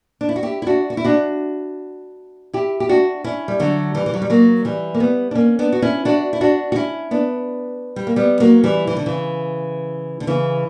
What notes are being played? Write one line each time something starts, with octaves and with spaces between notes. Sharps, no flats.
D4
E4
F#4
E4 G4
E4
D4 F#4
F#4
E4
D4 F#4
E4 G4
G4
D4 F#4
C#4 E4
G3
D3 F#3
E3 G3
E3
F#3
G3
F#3 A#3
E3 G3
A#3
G3 B3
D4
A#3 C#4
B3 D4
F#4
C#4 E4
D4 F#4
E4
D4 F#4
F#4
C#4 E4
B3 D4
G3
A#3
G3 B3
F#3 A#3
E3 G3
E3
D3
C#3 E3
D3
C#3 E3